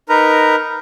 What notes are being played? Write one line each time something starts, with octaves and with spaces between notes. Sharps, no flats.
D#4 A#4 B4 A#5